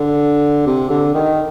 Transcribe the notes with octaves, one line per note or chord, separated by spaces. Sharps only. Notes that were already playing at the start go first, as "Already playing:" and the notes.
Already playing: D3
C3
D3
D#3